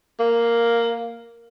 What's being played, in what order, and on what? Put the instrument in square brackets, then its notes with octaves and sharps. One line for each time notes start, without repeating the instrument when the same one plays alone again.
[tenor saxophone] A#3